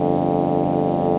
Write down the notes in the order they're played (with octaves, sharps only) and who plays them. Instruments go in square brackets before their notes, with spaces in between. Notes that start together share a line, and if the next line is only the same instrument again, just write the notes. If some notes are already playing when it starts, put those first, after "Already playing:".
Already playing: [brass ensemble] G1 F2 D3